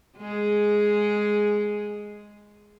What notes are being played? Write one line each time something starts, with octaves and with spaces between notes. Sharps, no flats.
G#3 G#4